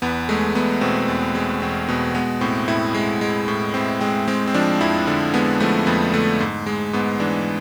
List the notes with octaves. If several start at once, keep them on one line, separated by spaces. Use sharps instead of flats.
E2 B3
G#3 A3
E2 B3
B2 C4
E2
G#3
E2 C4
B2 B3
G#3 B3
A2 C4
A2 E4
G#3
G#3
A2
A2 C4
G#3 C4
G#3 C4
C4
F3 D4
F2 E4
D3 D4
G#3 B3
F3 A3
F2 B3
D3 A3
G#2
G#3
G#2 B3
E3 D4